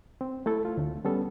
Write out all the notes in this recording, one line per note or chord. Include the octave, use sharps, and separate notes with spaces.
C4
A3 E4 A4
F4
D2
G3 B3 C#4 A4